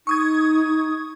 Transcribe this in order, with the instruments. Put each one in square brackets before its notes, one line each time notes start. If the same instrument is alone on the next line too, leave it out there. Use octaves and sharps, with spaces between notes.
[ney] D#4 [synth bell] C#6 D#6 G#6